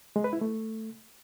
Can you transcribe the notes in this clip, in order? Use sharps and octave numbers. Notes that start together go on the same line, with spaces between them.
G#3
B4
E4
A3